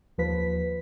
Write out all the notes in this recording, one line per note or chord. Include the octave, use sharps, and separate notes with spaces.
D#2 F3 B4 B6